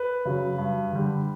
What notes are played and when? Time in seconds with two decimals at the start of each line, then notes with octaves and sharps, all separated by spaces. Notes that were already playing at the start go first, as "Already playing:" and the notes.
Already playing: B4
0.25 C#3 F#3
0.58 G2
0.92 D3 G3